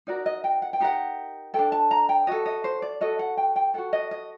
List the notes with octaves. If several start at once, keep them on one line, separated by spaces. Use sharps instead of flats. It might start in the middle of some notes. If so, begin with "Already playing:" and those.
D#4 F#4 A#4 D5
D#5
G5
F#5
G5
D#4 G4 A#4 F#5
D4 F#4 A4 G5
A5
A#5
G5
F#4 A4 D#5
D#5
C5
D5
F#4 A4 D#5
F#5
G5
G5
F#4 A4 F#5
D#5
D#5